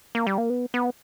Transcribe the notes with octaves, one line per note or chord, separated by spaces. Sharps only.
A#3
G3
A#3
B3
B3